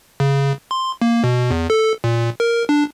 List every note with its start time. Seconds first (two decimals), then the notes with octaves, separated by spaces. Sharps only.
0.20 C#3
0.71 C6
1.02 A#3
1.24 B2
1.51 E2
1.70 A4
2.04 A#2
2.40 A#4
2.69 D4